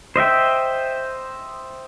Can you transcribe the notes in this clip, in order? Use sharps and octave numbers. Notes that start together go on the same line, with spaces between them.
C5 D#5 E5 G5